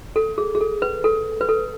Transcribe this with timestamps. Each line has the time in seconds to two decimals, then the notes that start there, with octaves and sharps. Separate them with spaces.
0.16 A4
0.38 G#4
0.55 G#4
0.61 A4
0.82 B4
1.04 A4
1.41 B4
1.49 A4